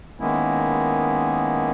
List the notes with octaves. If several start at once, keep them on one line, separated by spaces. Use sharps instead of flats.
D#3 G#3 A#3 B3 C#4 E4